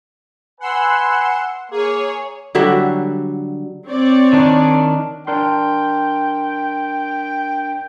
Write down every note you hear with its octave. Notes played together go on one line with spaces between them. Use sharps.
B4 F#5 G#5 C6 E6
A#3 G#4 C#5
D3 F#3 G3 E5
C4 C#5 D5
D#3 D4
D4 A#4 G5 C6